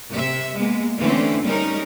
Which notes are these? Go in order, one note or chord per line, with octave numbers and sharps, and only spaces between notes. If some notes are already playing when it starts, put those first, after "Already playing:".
C3 E5
G#3 A#3 B3
D3 E3 A3 C4 C#4
G3 G#3 C#4 D#4 A#4